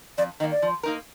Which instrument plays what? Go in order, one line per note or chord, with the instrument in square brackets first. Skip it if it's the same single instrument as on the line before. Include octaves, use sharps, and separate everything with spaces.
[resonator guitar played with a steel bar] F2 [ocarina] D5
[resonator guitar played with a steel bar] D#3 [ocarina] D#5
[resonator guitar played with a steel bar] A#3
[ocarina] D5
[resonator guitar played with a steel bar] F3
A#3 D#4 A#4